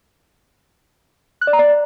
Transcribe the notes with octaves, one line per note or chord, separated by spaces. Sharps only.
F#6
D5
A#5
D5